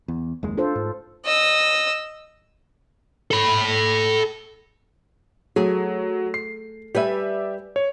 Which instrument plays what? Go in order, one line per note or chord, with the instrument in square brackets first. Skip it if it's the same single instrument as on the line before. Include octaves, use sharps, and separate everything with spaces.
[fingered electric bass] E2
F#1 D#2 G#3
[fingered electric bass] D4 [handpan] F4 A4 C5
[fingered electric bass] G#2
[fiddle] D#5 E6
[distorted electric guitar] A4 B5
[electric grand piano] F#3 [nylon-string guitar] A3 G#4
[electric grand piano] C7
[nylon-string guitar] G3 B4 G#5 [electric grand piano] G4 D5 E5
[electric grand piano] C#5